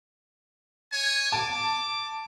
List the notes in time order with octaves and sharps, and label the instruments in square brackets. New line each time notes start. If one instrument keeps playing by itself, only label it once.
[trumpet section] C#5 G#5
[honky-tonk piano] A5 [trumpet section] D6